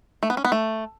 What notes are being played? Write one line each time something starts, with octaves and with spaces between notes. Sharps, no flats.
A3
B3
C#4
B3
A3